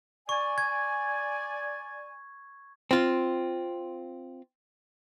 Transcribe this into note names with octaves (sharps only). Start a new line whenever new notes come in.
D5 G#5 C#6
G#6
C4 F4